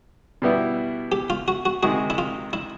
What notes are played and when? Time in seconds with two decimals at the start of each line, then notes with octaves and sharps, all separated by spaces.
0.42 B2 G3 B3 E4
1.12 G4
1.30 F4
1.48 F#4
1.65 F#4
1.83 C3 D#3 G#3 F#4
2.10 E4
2.18 F4
2.53 E4